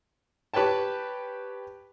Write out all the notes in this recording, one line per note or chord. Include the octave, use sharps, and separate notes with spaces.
G4 B4 C#5 G5 A5